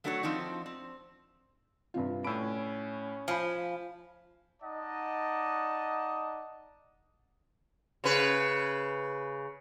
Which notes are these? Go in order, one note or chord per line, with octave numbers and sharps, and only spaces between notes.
F#3 A3 D4 F#4 A#4 C#5
F3 C4 D4 D#4
C4
G2 C3 F4
A2 C#4 B5 E6 D7
F3 G#5 B5
D#4 D5 D#5 F#5 A5
C#3 B4